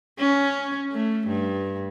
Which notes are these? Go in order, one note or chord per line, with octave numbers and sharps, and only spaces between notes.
C#4
A3
G2